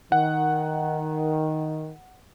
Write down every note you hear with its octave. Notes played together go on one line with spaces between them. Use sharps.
D#3 F#5